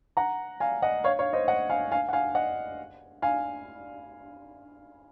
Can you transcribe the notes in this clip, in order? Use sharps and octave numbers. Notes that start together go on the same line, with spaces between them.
F#5 A#5
F5 G#5
D#5 F#5
C#5 F5
C#5 F5
C5 D#5
D#5 F#5
F5 G#5
F5 G#5
F#5
F5 G#5
D#5 F#5
F5 G#5